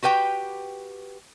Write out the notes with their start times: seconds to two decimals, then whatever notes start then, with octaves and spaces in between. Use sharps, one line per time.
0.03 F#4 G4 B4 G5